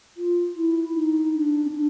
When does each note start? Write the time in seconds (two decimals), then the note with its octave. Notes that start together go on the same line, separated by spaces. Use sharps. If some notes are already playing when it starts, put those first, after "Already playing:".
0.17 F4
0.56 E4
0.94 D#4
1.34 D4
1.65 C#4
1.71 D4